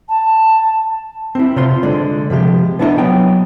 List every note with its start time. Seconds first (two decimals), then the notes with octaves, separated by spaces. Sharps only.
0.09 A5
1.35 C4 E4
1.56 C3 F4 C5 C6
1.83 D3 G#3 D5
2.30 C3 F3 G#3 G4
2.79 B3 D4 E4 C5 D#5
2.98 F#3 B3 G5